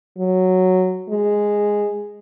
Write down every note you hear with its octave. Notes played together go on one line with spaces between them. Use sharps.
F#3
G#3